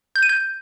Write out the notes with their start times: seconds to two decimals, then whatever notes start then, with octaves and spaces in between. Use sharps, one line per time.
0.16 G6
0.22 D#7
0.29 G6